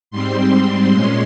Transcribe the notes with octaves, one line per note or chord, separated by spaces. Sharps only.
G#2 G3 C4 C6
A#2 G#3 C#4 C6